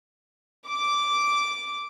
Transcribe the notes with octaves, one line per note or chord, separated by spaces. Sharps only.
D6